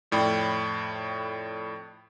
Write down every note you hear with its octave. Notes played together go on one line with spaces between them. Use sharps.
F2 A2 D5 G5 B5